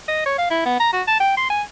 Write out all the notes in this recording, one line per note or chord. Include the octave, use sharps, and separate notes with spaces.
D#5
C#5
F5
E4
B3
A#5
F#4
A5
G5
C6
G#5